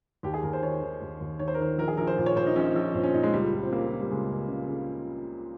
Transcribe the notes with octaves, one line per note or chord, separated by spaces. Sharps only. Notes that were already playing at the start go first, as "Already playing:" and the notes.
D#2 G4
G#4
D#2 A#4
C5
D#3 C#5
D#3
D#2
D#2
D#3 C#5
C5
A#4
D#3 C5
A#1 A#4
G#4
A#1 A#4
C5
A#2
C#5
A#2 C5
D#4
A#1 C#4
A#1
A#2 C4
C#4
A#2 D#4
G#3
C#2 G3
C#2
C4
C#3 A#3
C#3
G3
C#2 G#3
C#2
C#3
C#3